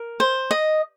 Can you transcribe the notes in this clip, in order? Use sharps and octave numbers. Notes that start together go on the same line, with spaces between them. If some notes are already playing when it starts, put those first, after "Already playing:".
Already playing: A#4
C5
D#5